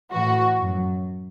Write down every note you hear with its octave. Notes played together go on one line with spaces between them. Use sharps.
A2 E3 F#4
F#2 F#3